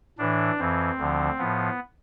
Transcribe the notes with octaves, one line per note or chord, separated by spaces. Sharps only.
A2 E3 D4
F2 E3 C4
D2 D3 F3
A2 F3 B3